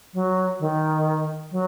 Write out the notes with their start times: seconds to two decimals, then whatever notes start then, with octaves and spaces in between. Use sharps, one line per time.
0.13 F#3
0.59 D#3
1.51 F#3